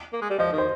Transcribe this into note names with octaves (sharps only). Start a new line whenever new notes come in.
A#3
G#3
G3
F3 D#5
D#3
C5